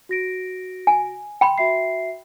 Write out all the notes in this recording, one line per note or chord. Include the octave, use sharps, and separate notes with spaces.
F#4 A#6 D7
G#5
G5 B5 C6
F#4 E5 C7